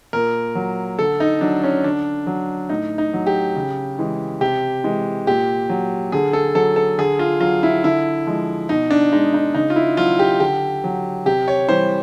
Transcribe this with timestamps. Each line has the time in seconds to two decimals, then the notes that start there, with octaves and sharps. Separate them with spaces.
0.13 A#2 A#4
0.55 F#3
0.99 D3 A4
1.20 D#4
1.41 F#3 D4
1.64 C#4
1.84 D3 D4
2.27 F#3
2.69 A2 D#4
2.98 D#4
3.13 F#3
3.26 G4
3.56 C#3
3.99 E3 G#3
4.41 C3 G4
4.84 E3 G#3
5.27 A#2 G4
5.70 F#3
6.12 D3 G#4
6.33 A4
6.55 F#3 A4
6.76 A4
6.98 D3 G#4
7.19 F4
7.40 F#3 F4
7.63 E4
7.84 D3 E4
8.27 F3 G#3
8.69 B2 D#4
8.91 D4
9.12 G#3 D#4
9.34 D#4
9.54 C#3 D#4
9.70 F4
9.76 E4
9.97 F#3 F4
10.19 G4
10.40 D3 G4
10.84 F#3
11.26 C3 G4
11.48 C#5
11.69 E3 G3 C5